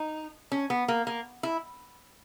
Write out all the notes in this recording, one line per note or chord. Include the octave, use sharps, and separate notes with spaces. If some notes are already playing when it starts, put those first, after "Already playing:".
Already playing: D#4
C#4
B3
A#3
A#3
E4